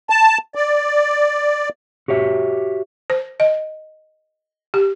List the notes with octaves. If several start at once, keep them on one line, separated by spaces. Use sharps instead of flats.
A5
D5
F#4 G4 C#5 E5
C5
D#5
G4